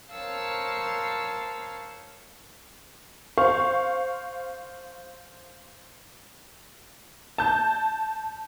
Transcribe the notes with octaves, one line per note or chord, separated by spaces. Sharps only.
A#4 C5 C#5 F5 A5 E6
C5 F5 C#6
A5 G6